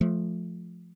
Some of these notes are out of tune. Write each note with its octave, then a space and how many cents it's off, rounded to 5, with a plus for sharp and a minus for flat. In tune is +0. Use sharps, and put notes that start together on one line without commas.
F3 +0 A3 -20